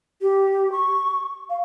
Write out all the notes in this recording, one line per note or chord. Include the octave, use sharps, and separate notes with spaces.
G4
C#6
F5